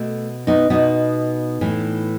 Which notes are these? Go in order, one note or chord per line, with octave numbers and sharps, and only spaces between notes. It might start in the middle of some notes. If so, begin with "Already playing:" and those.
Already playing: B2 A3
B3 D#4
B2 B3 D#4
A2 E3